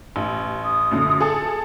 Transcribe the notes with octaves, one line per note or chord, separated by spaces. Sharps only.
A1
D#6
F#2 A#2 D3
G#4 A4